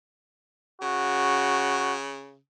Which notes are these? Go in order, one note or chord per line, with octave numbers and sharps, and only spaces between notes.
C#3 F#4